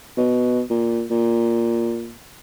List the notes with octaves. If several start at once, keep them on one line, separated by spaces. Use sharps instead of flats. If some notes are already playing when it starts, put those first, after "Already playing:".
B2
A#2
A#2